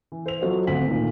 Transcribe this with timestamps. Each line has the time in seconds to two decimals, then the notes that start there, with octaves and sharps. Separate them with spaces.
0.12 E3
0.26 C5 F7
0.40 F#3 F4 F#4 A4 C5 D#5
0.67 G#1 D2 B3 F#5 B6 F#7
0.87 A#2 D#3 A3